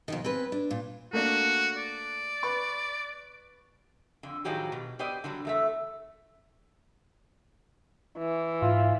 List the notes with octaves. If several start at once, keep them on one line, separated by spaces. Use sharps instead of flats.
F2 B2 D#3
C4 C#4 B4
D4
A#2
A3 A#3 D4 F#4
D5
B4 B5 C#6
F2 D3
A2 D#3 F3 F#3 G4 G#4
B2
B3 G4 C5 D5 D#5
D3 F#3 G3
E2 A3 E5
E3
G#2 F4